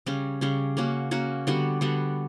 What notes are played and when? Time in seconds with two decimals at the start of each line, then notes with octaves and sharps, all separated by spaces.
0.06 C#3 G3 C#4
0.41 C#3 G3 C#4
0.77 A#3 C#4 F#4
1.11 A#3 C#4 F#4
1.47 D3 G3 B3 F#4
1.81 D3 G3 B3 F#4